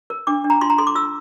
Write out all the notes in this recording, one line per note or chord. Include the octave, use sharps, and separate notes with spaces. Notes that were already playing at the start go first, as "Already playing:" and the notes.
A#4
D4 D6
D4
A#5
F4 C6
A#5
A4 C6
D6
F4 E6